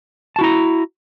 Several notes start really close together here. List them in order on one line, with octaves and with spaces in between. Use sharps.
A5 F#4 E4 A#5